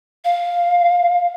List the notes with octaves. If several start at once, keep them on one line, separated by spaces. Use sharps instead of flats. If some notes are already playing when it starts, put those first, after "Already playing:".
F5